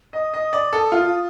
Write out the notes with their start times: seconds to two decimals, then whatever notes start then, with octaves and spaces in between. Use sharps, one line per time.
0.13 D#5 D#6
0.34 D#5
0.53 D5
0.73 A4
0.92 F4